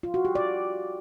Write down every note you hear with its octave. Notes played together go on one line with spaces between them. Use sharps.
F4
F#4
G4
D5